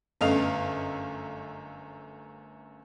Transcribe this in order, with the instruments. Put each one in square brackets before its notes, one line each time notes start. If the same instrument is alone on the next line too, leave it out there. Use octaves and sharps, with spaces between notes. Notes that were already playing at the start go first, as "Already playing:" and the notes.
[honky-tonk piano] G1 F#2 A3 D#5 F5 F7